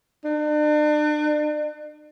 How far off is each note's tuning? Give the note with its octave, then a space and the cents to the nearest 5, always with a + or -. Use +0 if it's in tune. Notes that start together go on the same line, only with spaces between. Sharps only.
D4 +40